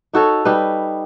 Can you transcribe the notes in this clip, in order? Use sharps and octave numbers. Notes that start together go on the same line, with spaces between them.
D#4 F#4 A4 C#5
G3 D#4 B4